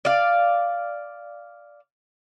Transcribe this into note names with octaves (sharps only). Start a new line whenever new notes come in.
D5 F5